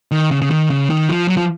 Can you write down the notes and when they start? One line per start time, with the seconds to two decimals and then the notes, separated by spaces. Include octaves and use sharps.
0.12 D#3
0.31 C#3
0.41 C#3
0.51 D#3
0.70 C#3
0.90 D#3
1.09 F3
1.28 F#3
1.37 F3